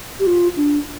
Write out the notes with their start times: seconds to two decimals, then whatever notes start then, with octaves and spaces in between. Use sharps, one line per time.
0.20 G4
0.27 F4
0.57 D4